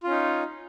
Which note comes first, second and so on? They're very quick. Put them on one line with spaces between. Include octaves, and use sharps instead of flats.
F4 C#4 D#4